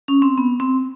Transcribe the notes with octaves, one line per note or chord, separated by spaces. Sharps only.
C#4
C4
B3
C4